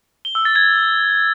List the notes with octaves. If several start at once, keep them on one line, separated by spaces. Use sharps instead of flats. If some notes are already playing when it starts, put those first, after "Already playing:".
G7
E6
A6
G#6